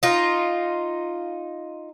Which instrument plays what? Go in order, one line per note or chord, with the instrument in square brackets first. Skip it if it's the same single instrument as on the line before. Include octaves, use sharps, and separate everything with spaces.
[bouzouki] D#4 F4